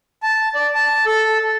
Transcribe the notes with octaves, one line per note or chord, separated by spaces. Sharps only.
A5
D5
A5
A4